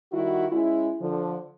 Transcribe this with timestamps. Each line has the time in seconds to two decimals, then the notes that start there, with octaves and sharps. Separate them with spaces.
0.12 D#3 G3 E4 F#4
0.51 G#3 C#4 E4
1.00 D3 F3